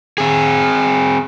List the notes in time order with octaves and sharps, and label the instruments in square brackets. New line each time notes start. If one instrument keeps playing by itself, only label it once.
[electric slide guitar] C4 G#4